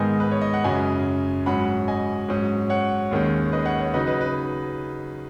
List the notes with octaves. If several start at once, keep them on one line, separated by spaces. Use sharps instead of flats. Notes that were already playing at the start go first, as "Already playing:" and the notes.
Already playing: G#2 D#3 G#3 B3 D#5 G#5
B4
C#5
D#5
F#5
F#2 C#3 G#3 C#4 D#5 G#5
G#2 F#3 C#4 F#5 B5
D#5 G#5
G#2 F#3 C#4
C#5 F#5
D#2 D#3 G#3 C#4
B4 D#5
C#5 F#5
C#5 F#5
C#3 F#3 D#4 B4 D#5
B4 D#5
B4